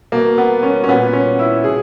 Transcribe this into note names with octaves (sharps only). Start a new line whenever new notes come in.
B2 A#3
B3
C#4
C#4
A#2 B3
C#4
E4
B2 G#4